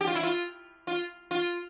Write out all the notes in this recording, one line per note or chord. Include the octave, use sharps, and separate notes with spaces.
G4
F4
E4
F4
F4
F4